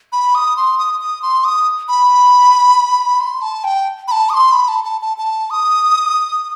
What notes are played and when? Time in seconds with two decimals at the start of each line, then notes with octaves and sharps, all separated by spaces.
0.13 B5
0.35 D#6
0.57 C6
0.78 D#6
1.01 D#6
1.22 C6
1.44 D#6
1.88 B5
3.20 C6
3.42 A5
3.64 G5
4.08 B5
4.12 A5
4.30 D#6
4.34 C6
4.52 B5
4.68 A5
4.85 A5
5.01 A5
5.18 A5
5.50 D#6